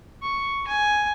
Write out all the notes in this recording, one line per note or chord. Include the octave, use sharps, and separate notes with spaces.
C#6
G#5